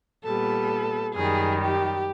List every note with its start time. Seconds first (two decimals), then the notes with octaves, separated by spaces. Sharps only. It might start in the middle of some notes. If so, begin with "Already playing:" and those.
0.24 A#2 G3 B3 A4
1.15 F#2 D#3 G3 G#4
1.61 G4